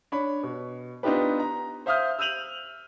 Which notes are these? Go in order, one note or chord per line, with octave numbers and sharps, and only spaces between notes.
D4 C#5 B5
B2
B3 D4 D#4 F4 G4 B4
A#5
C5 E5 F5 D#6 F6 G6
E6 G6 D#7 F7 F#7